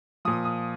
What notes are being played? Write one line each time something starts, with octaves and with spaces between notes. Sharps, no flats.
A#2 F3 D#6
D#6